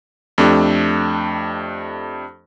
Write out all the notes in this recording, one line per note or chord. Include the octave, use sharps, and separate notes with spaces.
F2 A3 D4 G4